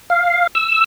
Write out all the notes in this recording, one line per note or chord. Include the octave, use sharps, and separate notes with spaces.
F5
E6